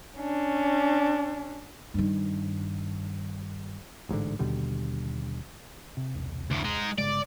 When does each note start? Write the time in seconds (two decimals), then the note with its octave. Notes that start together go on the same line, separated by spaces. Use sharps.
0.17 C#4 D4
1.94 G2 D#3
4.09 A1 G#2 B2 D3
4.39 D#2 B2 D3 G3
5.97 C3
6.15 E1 C2
6.50 D2 A2
6.65 G#3 D#4
6.98 G1 C#3 G#3 D5